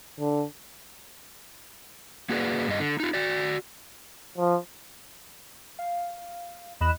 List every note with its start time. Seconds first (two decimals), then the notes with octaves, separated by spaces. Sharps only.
0.19 D3
2.29 A#3 F#4 G#4 B4 D5
2.67 G2 D#5
2.80 D3
3.00 D#4 F4
3.14 F#4 D5
4.38 F3
5.79 F5
6.80 E2 D#5 B5 F#6 E7